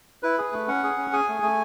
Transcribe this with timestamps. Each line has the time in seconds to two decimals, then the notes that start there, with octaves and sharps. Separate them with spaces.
0.23 E4 B4
0.38 G#4
0.53 A3
0.68 C#4 F#5
0.84 G#4
0.98 C#4
1.13 G#4 G#5
1.28 A3
1.43 A3